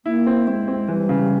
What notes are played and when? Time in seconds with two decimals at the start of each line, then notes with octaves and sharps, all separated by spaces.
0.05 A#3 E4
0.26 C4
0.47 G#3 C4
0.68 C4
0.88 E3 G3
1.09 C#3